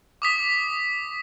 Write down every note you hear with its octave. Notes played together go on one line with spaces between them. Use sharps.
D6 D#6 B6